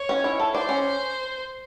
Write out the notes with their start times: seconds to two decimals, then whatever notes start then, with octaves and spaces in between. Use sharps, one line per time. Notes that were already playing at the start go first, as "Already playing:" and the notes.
Already playing: C#5
0.09 C#4
0.24 E4
0.39 A4
0.54 C5 D5
0.69 C#4